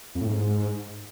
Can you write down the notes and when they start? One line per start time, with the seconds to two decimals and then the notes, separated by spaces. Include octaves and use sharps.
0.15 F2
0.21 A2
0.27 G#2